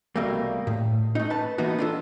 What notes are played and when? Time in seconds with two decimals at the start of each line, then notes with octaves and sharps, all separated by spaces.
0.16 C2 B2 G3 A3 A#3
0.67 A2
1.15 A3 D#4
1.30 B4 A5
1.58 E3 A#3 B3 D#4 F#4
1.78 D4 F4 A4